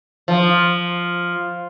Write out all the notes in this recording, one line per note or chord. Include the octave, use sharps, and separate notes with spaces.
F3